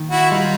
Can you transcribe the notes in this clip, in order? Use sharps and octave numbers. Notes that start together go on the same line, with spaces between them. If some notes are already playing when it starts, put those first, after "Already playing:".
Already playing: D#3 A#3
E4 F#4
G3 D#4 F4